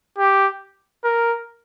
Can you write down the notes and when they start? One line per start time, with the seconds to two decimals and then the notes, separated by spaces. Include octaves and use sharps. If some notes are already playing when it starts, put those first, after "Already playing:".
0.18 G4
1.04 A#4